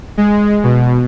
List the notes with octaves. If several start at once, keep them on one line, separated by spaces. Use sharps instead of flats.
G#3
B2